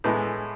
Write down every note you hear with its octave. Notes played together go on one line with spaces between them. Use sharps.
A2 E3 G#3 B3 E4